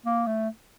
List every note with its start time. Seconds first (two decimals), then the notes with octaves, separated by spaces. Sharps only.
0.05 A#3
0.27 A3